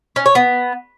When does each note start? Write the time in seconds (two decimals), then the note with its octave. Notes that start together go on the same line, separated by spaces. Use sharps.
0.16 C#4
0.26 C#5
0.35 B3